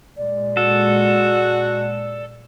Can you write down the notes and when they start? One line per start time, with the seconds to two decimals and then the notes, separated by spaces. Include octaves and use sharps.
0.17 A#2 G#3 D5
0.57 F#4 A4